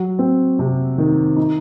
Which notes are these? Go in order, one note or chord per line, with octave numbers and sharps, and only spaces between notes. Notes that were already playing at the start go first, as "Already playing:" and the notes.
Already playing: F#3
C4
C3
D#3
D#4